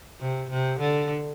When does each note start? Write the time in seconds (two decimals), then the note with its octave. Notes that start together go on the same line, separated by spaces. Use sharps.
0.20 C3
0.50 C3
0.79 D3